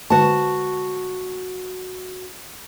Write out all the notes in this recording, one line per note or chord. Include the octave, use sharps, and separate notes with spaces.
D3 G#3 F#4 B4 A5